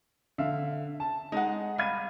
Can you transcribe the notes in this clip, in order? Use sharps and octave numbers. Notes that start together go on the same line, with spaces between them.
D3 E5 F5
A5
G#3 D#4 F#5
G3 F5 G#6 D#7